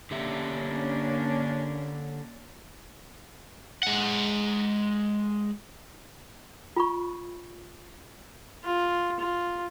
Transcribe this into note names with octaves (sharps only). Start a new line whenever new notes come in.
D3 A#3 C#4 D4 G4 E5
G#3 F#5
F4 B5 C#6
F4
F4